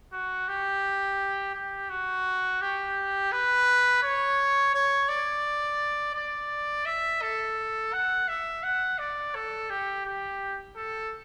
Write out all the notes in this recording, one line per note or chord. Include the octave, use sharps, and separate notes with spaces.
F#4
G4
G4
F#4
G4
B4
C#5
C#5
D5
D5
E5
A4
F#5
E5
F#5
D5
A4
G4
G4
A4